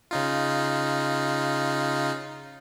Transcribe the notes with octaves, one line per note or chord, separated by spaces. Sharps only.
C#3 D#4 F4